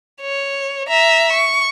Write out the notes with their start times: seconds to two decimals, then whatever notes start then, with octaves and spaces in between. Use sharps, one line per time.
0.21 C#5
0.89 E5 A#5
1.32 C#6